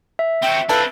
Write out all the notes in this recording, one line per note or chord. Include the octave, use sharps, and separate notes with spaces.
E5
C4 F#4 G5
F3 C4 D4 E4 A4 B4